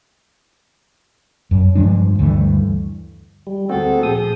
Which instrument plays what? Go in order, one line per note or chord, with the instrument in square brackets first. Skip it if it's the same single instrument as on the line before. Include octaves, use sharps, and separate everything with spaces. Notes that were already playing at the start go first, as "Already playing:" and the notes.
[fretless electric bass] F#2
G2 F3 G#3 D4
D2 G2 E3 A3
[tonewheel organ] G3
[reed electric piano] D2 A3 G5 [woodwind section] A#3 G#4 A4 [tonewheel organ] C4 F#4
[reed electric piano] A#2 G#4 [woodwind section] F3 [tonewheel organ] D#6